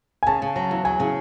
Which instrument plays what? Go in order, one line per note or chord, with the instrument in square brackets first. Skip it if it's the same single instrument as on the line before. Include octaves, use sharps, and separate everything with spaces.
[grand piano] G#5
[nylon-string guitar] C#3 [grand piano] A5
[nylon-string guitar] C#3
F#3
E2
[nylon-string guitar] F#3 [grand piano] G#5
[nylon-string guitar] C#3